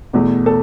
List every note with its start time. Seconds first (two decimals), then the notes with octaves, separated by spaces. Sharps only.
0.13 E2 B2 A3
0.46 A4